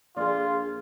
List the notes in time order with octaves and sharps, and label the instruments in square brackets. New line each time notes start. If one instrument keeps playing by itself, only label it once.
[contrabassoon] A#1 [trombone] F4 [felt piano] G#4 D5